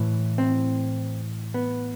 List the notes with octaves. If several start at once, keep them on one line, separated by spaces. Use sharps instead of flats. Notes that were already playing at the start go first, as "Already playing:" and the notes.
Already playing: A2 E3
C4
B3